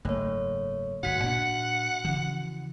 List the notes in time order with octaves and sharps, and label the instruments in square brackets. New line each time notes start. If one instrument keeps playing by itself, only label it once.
[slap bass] F#1 G#2 [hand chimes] A3 A#3 C#5
[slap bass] G1 G#2 [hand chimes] F#4 B6 [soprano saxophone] F#5
[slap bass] A#2 D4
C#3 E3 F3